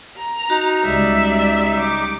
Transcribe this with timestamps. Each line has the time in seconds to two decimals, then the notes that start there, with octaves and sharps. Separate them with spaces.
0.17 A#5
0.50 D#4 F#4
0.85 C#2 G3 G#3 D5 E5
1.80 D6